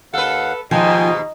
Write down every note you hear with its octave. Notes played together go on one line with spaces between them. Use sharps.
D#2 A4 B4 F5 F#5
D#2 G#2 B2 F3 D#4 G5 G#5